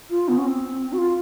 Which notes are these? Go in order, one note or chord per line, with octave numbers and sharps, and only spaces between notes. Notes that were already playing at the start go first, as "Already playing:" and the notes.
F4
B3
C#4
C4
F#4
F4